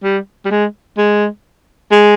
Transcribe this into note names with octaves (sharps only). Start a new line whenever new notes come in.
G3
G3
G#3
G#3
G#3